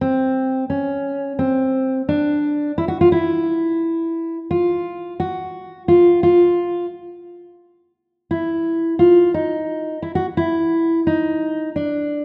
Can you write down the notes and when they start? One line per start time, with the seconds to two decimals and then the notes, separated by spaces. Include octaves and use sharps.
0.01 C4
0.70 C#4
1.39 C4
2.09 D4
2.78 E4
2.88 F#4
3.01 F4
3.12 E4
4.51 F4
5.20 F#4
5.88 F4
6.23 F4
8.31 E4
8.99 F4
9.34 D#4
10.02 E4
10.15 F#4
10.37 E4
11.07 D#4
11.76 D4